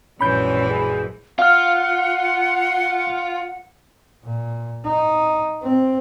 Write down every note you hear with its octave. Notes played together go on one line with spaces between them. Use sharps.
A#1 F#2 E3 G#3 C#4 B5 G6
G#4
F4 F5 F#5 F6
A#2
D#4
C4